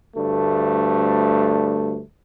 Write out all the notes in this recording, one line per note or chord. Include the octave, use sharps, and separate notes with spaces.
D2 G2 A3